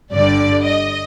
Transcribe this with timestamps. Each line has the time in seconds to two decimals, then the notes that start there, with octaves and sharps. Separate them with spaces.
0.13 G1 G2 D3 G3 D5
0.66 D#5